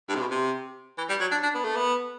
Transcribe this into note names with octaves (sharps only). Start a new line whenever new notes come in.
G2
C3
B2
C3
E3
G3
F#3
D4
D4
B3
A3
B3